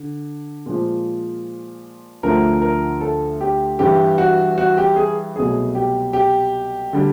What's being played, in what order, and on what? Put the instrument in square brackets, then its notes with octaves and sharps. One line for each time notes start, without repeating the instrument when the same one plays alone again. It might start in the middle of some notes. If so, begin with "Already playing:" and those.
Already playing: [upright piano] D3
A#2 F3 G#3
D2 D3 F3 A3 A#4
A#4
A4
G4
G2 E3 G3 G4
F#4
F#4
G4
G#4
C2 B2 F#3 A3 G#4
G4
G4
D3 G3